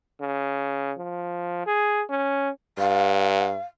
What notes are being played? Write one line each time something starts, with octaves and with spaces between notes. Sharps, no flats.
C#3
F3
G#4
C#4
G2 F5